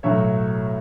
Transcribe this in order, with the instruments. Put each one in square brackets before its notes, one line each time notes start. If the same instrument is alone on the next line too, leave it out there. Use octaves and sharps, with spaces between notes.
[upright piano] B1 A2 F#3 A3 C#5 E5